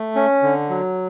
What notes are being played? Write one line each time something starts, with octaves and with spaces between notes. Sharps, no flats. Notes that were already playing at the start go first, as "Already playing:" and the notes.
Already playing: A3
C#4
D3
F#3